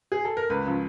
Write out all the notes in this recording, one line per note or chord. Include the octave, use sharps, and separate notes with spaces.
G#4
A4
A#4
C#2 B4
C#3 F3